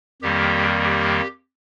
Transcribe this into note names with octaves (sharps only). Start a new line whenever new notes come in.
F2 D#3 G3 A#3 G4
G4